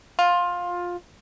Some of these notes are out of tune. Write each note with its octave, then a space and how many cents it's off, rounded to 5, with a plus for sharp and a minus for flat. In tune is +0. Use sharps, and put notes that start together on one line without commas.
F4 +15